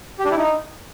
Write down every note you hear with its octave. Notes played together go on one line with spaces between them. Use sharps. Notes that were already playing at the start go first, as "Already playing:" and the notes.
G4
D4
E4
D#4